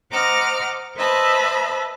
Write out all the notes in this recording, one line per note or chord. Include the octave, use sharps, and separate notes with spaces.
C5 D#5 F#5 A#5 D6 F6
B4 C5 D#5 E5 A5 B5